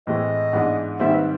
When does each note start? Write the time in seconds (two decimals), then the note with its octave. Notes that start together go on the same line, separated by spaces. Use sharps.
0.07 A2 E3 G#3 C4 D#5
0.53 G#2 E3 G#3 B3 D4
0.99 G#2 D#3 G3 C4 E4 E5
1.15 B4